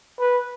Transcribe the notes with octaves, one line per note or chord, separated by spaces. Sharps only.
B4